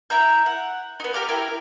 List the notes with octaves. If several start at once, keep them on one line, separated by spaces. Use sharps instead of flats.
E4 E5 A#5 G6
F#5
B3 D#4
G4 A#4 F5 D6
E4 A#4 G5